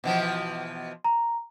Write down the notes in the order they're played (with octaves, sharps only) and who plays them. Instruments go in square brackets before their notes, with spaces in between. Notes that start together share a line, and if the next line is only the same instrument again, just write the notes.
[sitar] B2 E3 F3
[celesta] A#5